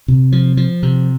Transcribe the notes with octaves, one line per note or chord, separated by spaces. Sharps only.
C3
F3
F3
C3